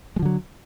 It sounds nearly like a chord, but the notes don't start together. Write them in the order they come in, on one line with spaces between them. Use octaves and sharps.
G#3 F3 D3 F#3